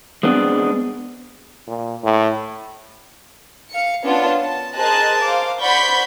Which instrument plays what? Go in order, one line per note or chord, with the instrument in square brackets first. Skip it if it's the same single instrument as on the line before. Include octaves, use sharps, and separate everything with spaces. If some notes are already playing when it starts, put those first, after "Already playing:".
[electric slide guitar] G#3 B3 C4 D4
[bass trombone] A#2
A2
[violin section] F5 C#7
B3 C#4 D4 F4 A5
A5
G#4 A#4 C5 D#5 A5 F#6
C5 F5 D6
C5 D5 F#5 B5 C#6 G6